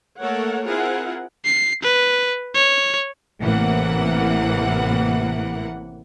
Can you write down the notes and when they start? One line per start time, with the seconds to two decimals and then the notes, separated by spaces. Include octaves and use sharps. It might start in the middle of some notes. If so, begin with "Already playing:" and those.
0.19 A3 A#3 A4 A#4 C#5 F#5
0.65 C4 E4 F4 G#4 A#4 F#5
1.45 C7
1.82 B4
2.54 C#5
3.40 A1 A2 C3 E3 A#3 F#5